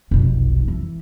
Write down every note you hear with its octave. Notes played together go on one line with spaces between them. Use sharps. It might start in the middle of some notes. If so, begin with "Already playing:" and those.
F1 B1
E3